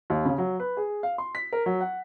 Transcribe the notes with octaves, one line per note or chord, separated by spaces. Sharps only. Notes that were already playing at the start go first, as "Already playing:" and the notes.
D#2
C#3
F#3
B4
G#4
F5
C6
B6
A#4
F#3
F#5